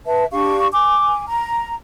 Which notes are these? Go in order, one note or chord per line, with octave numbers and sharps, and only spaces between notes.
B4 E5 A5
D4 G4 F5 C#6
G#5 D6
A#5